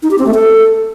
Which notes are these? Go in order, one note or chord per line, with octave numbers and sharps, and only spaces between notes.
D#4
G4
C4
A3
A4